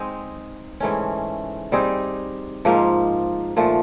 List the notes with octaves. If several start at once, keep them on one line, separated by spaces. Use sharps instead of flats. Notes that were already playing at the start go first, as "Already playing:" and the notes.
Already playing: G#3 C4 D#4 G#4
G#2 E3 A3 C#4
G3 C4 D#4 G#4
G#2 F3 A#3 D#4
A#2 F3 A3